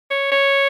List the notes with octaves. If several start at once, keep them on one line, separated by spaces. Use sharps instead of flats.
C#5
C#5